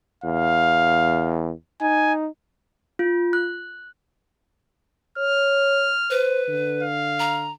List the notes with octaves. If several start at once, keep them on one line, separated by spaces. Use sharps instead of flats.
E2 F5
D#4 G#5
F4
F#6
C#5 F6
B4 C5
D3
F5
A#5